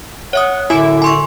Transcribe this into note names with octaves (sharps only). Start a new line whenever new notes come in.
C#5 E5 F#5 D#6
F#2 A2 D3 E4 E5 G#5 D6
G#5 C6 C#6